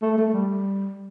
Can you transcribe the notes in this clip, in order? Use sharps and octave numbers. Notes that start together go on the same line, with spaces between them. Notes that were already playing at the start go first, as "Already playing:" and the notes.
A3
A3
G3